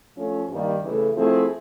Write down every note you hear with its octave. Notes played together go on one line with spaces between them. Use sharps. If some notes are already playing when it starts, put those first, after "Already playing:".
F3 A3 C#4
G2 D#3 G3 A#3
C#3 E3 A3
F3 A3 C4 E4 G#4